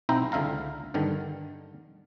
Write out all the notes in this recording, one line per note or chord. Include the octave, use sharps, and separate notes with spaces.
B1 C4 D#4 E4 C5 A#5
C#2 D3 E5 F5 A#5
G2 D3 D#3